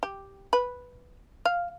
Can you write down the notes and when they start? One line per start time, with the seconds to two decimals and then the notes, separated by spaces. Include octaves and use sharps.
0.03 G4
0.53 B4
1.45 F5